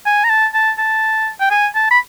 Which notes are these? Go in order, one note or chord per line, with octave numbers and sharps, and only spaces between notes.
G#5
A#5
A5
A5
A5
G5
G#5
A5
B5